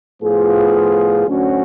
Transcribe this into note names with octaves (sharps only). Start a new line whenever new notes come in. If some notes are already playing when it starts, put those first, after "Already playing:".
A2 F3 B3 F4 G#4
D2 D3 F#3 C#4 F#4